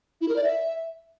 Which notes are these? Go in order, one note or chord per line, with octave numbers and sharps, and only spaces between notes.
E4
A#4
D5
E5